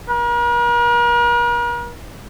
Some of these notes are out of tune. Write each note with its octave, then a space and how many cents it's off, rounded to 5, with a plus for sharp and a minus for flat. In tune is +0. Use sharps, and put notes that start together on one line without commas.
A#4 +45